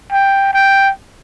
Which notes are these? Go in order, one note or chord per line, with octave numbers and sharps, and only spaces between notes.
G5
G5